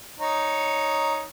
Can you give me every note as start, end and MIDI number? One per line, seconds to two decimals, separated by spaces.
0.19 1.24 63
0.19 1.24 73